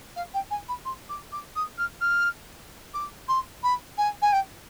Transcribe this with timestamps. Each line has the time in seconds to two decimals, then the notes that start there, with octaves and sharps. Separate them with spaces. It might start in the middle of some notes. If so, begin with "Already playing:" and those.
0.16 F5
0.34 G5
0.50 G#5
0.68 B5
0.85 C6
1.09 D6
1.32 D6
1.55 D#6
1.78 F6
2.01 F6
2.94 D6
3.28 C6
3.63 B5
3.97 G#5
4.22 G#5
4.32 G5